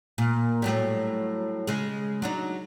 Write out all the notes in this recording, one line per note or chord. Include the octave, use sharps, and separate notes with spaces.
A#2
A2 F#3 G3
C#3 G#3
F#3 D4 D#4